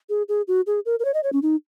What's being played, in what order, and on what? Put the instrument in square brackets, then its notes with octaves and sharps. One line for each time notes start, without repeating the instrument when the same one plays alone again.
[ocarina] G#4
G#4
F#4
G#4
A#4
A#4
C#5
D#5
C#5
C#4
D#4